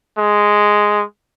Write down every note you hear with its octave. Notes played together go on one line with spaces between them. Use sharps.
G#3